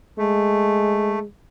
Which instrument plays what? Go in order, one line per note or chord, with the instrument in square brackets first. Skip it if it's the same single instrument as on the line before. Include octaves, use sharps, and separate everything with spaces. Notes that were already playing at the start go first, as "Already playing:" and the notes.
[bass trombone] G#3 [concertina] A3